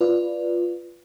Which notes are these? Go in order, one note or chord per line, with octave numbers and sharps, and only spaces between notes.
F4 B4 D5